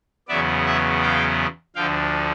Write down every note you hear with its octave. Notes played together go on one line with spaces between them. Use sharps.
E2 C#3 F#3 B3 D5 E5
E5 F#5
F5 G5
D2 D3 F3 F5 G5